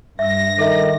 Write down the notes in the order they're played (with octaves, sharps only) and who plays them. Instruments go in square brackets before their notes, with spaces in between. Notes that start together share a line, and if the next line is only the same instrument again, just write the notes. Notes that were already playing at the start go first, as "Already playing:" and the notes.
[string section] G2 A#6 [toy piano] E5 E6
[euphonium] D#3 [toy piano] A4 E5